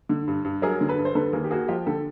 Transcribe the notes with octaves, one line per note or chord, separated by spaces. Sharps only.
D3
G2
G2
F#3 G#4 A#4
D3
A4 B4
G2
C5
D3 A4 B4
D#2 G#4 A#4
G4
A#3 F#4 G#4
F3 F4 G4
D3 G4 A4